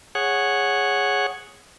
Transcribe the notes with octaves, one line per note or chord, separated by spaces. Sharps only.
G#4 C#5 F#5